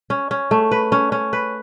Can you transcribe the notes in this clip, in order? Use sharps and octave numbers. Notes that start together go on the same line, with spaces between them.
C#4
C#4
A3
B4
C#4
C#4
B4